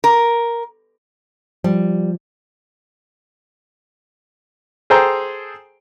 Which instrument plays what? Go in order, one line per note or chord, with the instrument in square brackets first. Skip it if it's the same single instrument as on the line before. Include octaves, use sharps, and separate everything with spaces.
[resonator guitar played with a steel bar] A#4
[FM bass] F3 [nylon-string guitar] G3
[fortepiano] G#4 A4 C5 G5 A#5